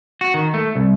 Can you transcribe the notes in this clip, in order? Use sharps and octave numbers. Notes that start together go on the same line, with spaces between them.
F#4
D#3
A3
C2